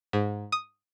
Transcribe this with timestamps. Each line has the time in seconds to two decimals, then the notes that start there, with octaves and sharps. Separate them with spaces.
0.13 G#2
0.52 D#6